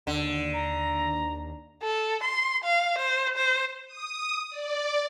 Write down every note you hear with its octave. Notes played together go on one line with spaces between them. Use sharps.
D#2 D3
A#5
A4
C6
F5
C5
C5
D#6
D5